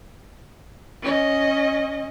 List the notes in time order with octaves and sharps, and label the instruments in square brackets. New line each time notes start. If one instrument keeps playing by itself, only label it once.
[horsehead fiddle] C#4 D#5